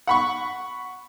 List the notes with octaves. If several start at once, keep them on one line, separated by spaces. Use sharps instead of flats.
F#5 B5 C#6